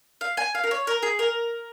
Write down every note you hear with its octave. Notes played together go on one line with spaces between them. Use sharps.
F5
G#5
F5
A#4
C#5
A#4
G#4
A#4